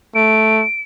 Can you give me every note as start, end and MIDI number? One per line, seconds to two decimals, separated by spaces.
0.15 0.64 57
0.15 0.82 98